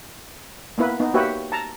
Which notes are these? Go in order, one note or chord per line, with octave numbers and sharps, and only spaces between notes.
A#3 B3 E4 B4
B3 D#4
A#3 F#4 G4 B4 C#5 E5
A5 A#5